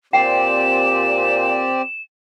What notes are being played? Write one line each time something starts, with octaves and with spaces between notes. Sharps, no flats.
A#2 C4 G4 D5 G5 E7